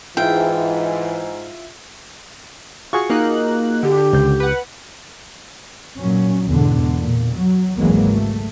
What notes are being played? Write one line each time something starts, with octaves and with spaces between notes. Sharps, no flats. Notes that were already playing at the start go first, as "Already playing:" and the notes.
G#2 E3 E4 F4 G5
F4 F#4 G#4 C#6
A#3 D#4 F#6
D3 G4
C#2 G6
B4 F#5
A#2 F#3 C#4
E2 G#2 B2 D3
A#2
F#3
G#1 C#2 E3 F#3 G#3 A#3
A3